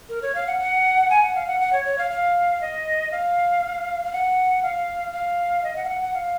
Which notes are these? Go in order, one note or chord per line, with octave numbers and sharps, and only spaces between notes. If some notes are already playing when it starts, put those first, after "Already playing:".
A#4
C#5
F5
F#5
F#5
G#5
F#5
F5
F#5
F#5
C#5
C#5
F5
F5
D#5
F5
F5
F#5
F5
F5
D#5
F#5
F5
F#5
F#5
F5